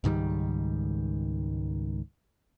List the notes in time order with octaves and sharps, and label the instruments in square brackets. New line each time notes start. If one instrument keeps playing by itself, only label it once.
[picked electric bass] C#2 G#2 D#3 G3